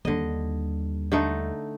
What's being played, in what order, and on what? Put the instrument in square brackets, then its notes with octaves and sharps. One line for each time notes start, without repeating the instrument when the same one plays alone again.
[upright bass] D#2 G3 [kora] D3 D#5
[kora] D3 A3 D#4